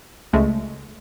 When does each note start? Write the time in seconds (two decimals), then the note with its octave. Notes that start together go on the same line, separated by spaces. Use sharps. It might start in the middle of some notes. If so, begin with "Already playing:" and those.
0.33 C#2 G#3 A3